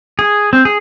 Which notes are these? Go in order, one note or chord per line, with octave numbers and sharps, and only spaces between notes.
G#4
C4
G#4